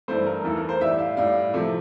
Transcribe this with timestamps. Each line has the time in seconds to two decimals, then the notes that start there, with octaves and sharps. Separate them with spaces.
0.08 G2 E3 A3 C5
0.26 A#4
0.44 E2 E3 A3 A4
0.57 A#4
0.69 C5
0.81 A2 G3 E5
0.99 F5
1.17 A2 G3 F5
1.54 C3 F3 A3